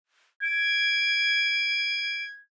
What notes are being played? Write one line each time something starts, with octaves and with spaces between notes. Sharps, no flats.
G#6 D7